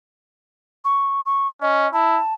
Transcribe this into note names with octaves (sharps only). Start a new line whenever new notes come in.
C#6
C#6
C#4 D#5
E4 A5